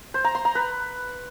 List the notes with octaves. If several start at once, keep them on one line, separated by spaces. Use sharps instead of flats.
C5
A#5
C6
A#5
B4